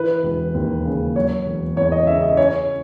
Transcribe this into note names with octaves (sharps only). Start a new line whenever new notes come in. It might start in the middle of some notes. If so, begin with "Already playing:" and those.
Already playing: E3 B4
E1
D#2
C#3
F#3 C#5
E1
E2 C#5
D#5
C#3 E5
D#5
C#4 C#5